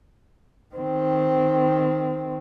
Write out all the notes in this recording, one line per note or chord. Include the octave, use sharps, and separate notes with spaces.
D#3 C4